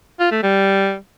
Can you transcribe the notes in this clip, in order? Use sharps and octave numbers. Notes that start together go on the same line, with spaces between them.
F4
A3
G3